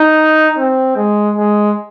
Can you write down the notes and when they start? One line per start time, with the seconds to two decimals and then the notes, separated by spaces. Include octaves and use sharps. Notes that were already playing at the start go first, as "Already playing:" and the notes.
Already playing: D#4
0.58 C4
0.96 G#3
1.36 G#3